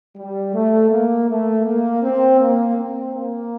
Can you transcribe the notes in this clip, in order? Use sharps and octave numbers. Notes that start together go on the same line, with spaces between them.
G3
A3
A#3
A3
A#3
C4
A#3
C4
A#3